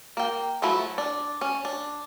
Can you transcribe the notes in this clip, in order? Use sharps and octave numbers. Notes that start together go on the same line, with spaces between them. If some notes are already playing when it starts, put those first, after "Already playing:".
A#3 G5
F3 F#3 A3 E4
D4
C#4
D4